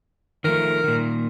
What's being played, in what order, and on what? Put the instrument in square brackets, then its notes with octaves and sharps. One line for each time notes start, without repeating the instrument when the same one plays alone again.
[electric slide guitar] D#3 F3 A3 [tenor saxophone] A#4
[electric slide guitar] A#2 D#3